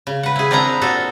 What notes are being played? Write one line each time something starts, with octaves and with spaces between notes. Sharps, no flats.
C#3
B4 F#5
E4 G#4
C4 D4 E4 A#4 F#5 A#5
A#2 F#4 A4